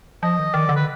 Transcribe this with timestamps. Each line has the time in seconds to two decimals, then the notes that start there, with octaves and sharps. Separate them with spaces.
0.23 F3 D#5
0.39 D#3
0.54 D#3 D5
0.69 D3
0.76 B4